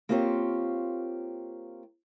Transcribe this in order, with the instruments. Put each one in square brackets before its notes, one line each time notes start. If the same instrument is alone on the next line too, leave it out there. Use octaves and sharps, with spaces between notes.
[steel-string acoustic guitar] A#3 C4 F4 G4 C#5